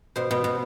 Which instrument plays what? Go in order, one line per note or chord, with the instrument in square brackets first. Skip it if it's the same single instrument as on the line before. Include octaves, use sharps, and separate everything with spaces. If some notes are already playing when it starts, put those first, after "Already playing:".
[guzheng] B2 C5
B2
B2